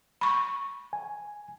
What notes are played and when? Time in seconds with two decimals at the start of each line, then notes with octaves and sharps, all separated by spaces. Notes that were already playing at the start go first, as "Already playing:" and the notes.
0.21 B5 C#6
0.93 G#5